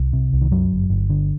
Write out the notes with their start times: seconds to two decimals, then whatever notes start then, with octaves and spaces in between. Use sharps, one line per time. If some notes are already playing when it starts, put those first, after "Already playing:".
Already playing: C2
0.13 C3
0.33 C2
0.41 D#3
0.51 F#2 F#3
0.71 G1
0.90 G1
1.10 D3